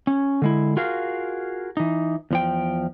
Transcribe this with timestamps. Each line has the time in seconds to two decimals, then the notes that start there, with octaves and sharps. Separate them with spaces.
0.07 C#4
0.42 D3 G#3 E4
0.77 F4 F#4 G#4 A#4 F5
1.77 E3 D#4
2.31 E2 F3 G5